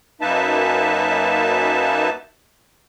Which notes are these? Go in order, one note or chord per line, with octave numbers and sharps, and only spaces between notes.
F#2 A#3 D#4 B4 E5 A5